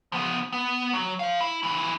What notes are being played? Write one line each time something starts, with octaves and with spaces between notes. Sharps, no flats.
F3 B3
B3
F#3
C5 F5
E4
F2 E3